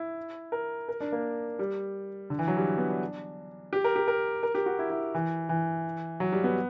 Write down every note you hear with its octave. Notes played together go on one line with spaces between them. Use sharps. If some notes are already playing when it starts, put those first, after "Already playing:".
Already playing: E4
A#4
A#4
D4
A#3
G3
D3
E3
F#3
G3
B3
D4
G4
A#4
G4
A#4
A#4
G4
F#4
E4
E4
E3
E3
F#3
G3
B3